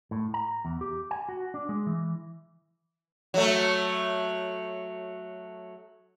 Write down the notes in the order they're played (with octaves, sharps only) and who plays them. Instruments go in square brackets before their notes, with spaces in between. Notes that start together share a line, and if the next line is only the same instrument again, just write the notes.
[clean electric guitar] A2
A#5
E2
G4
G#5
F#4
D4
G#3
E3
[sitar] F#3 A3